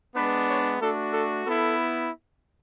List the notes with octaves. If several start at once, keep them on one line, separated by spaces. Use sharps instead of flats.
G#3 B3 D4 B4
C#5
A3 D4 F#4 A4
A4
B3 E4 A4